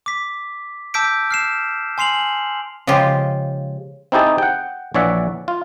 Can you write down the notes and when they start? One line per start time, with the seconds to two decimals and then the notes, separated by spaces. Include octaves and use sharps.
0.06 D6 B6
0.94 A5 D6 E6 G6 B6 D7
1.31 F6 C7 E7
1.98 G#5 C6 C7 F7 F#7
2.87 C#3 F3 G#3 F4 G4
4.12 C4 D#4 E4 G4 G#4 A5
4.38 F#5 G5
4.94 A#1 E3 C#5 D5 E5 F#5
5.48 F4